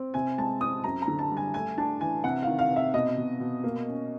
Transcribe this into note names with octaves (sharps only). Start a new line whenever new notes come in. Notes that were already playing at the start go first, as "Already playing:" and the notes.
Already playing: C4
C3 G#5
G#3 A5
C4 D#6
F#2 A#5
A#5
D3
A5
G3
G#5
A3 G#5
D4 A5
E3 G#5
C3 F#5
D#3 F5
F5
C3
E5
B2 D#5
B2
B2
A#3
C#4